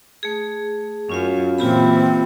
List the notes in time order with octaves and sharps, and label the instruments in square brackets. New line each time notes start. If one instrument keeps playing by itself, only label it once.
[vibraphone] A3 G#4
[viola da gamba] F#2 [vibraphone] C#4 F4 F5
[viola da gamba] A#2 E3 [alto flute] C4 [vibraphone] F4 G4 B5